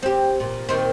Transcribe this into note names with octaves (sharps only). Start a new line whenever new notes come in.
C4 G4
A#2
A#2 D#3 C4